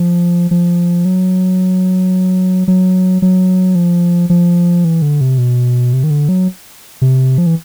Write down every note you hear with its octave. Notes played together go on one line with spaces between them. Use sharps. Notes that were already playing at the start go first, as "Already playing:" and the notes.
Already playing: F3
F3
F#3
F#3
F#3
F3
F3
E3
D3
C3
B2
C3
D#3
D3
F#3
C3
F3
E3